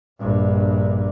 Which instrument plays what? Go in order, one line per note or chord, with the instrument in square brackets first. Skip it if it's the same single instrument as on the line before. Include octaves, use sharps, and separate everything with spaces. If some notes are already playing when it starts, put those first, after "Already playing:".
[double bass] A#1 G2